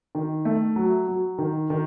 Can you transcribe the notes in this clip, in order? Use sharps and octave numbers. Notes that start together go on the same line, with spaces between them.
D#3
A3
F#3
F#3
D#3
D#3